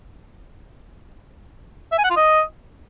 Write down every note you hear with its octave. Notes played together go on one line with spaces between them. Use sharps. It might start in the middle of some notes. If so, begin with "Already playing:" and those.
E5
G#5
F#5
F4
D#5